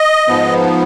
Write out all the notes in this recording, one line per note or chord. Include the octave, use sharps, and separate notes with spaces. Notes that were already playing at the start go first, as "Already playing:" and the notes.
Already playing: D#5
G#2 F3 B3